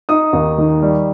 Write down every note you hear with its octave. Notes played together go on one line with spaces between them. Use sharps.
D#4 D#6
D#2
D#3
G3